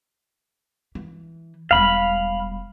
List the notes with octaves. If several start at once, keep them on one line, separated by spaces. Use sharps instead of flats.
E3
E1 G3 F5 B5